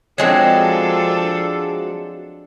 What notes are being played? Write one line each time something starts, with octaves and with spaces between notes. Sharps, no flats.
F3 F#3 G#3 C4 D4 A4